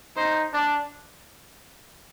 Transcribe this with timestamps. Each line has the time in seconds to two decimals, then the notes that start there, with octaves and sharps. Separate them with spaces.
0.16 D#4 C5
0.53 D4 D5